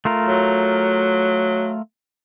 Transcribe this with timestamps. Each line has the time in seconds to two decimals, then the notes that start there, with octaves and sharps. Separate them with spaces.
0.05 A3 F4 A#4
0.26 F#3